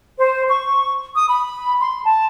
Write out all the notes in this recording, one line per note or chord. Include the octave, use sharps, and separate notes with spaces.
C5
C#6
D#6
B5
C6
A5